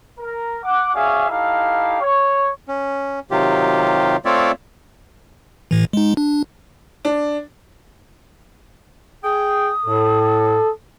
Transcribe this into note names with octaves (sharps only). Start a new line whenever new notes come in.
A#4
F#5 D6
C#4 F#4 G#4 D5 E5 F5
D#4 E4 G4 A4 F5
C#5
C#4
C3 D#3 F#3 F4 G4
A3 C4 F4 C#5 D5 E5
A2 E3
G#3 D#4
D4
D4
G#4 G5 D#6
A2 A4